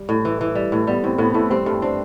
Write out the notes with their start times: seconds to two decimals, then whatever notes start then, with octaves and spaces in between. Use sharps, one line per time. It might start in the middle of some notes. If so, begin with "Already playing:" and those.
Already playing: G3
0.09 A2
0.25 E3
0.41 E3
0.55 G3
0.72 A2
0.87 G3 B3
1.04 A2 C4
1.18 A2 B3
1.34 A2 A3
1.50 G3 C4
1.66 G2 A3
1.82 C4 D4